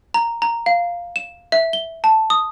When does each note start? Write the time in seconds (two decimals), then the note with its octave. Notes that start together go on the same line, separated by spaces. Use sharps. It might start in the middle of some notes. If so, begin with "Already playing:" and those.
0.14 A#5
0.42 A#5
0.66 F5
1.16 E7
1.52 E5
1.73 G7
2.04 A5
2.30 D#6